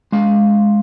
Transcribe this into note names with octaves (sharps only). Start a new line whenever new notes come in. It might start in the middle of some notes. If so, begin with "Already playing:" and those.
G#3 F5